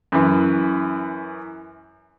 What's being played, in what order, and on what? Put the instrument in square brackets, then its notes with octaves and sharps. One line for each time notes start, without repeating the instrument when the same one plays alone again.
[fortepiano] F#2 E3